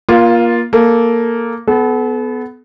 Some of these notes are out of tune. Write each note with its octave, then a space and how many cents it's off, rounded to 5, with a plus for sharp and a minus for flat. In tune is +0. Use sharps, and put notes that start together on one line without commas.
A#3 +25 F4 +0
A#3 +0 A4 -10
B3 +15 A4 -40